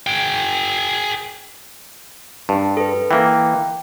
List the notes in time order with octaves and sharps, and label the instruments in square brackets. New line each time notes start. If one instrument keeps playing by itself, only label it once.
[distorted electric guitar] G#4 G5
[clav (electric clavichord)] G2 [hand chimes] A5
[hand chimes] A4 B4
[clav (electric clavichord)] E3 A#3 [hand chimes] G5